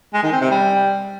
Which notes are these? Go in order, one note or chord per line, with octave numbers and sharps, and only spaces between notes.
G#3
D#3
C4
C3
G3